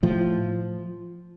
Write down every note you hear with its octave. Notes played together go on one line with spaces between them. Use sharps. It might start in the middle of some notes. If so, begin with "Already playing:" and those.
A2 F3